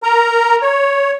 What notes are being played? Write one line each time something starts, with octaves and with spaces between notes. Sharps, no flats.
A#4 A#5
C#5